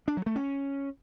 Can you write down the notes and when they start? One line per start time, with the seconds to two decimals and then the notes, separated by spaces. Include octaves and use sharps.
0.08 D4
0.17 F#3
0.26 A3
0.36 C#4